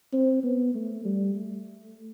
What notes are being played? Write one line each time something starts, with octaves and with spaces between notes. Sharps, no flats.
C4
B3
A3
G3
A3